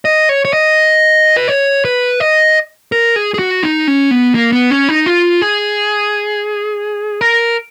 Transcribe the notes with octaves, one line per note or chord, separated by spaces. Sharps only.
D#5
C#5
C#5
D#5
B4
C#5
B4
D#5
A#4
G#4
G#4
F#4
D#4
C#4
B3
A#3
B3
C#4
D#4
F4
G#4
A#4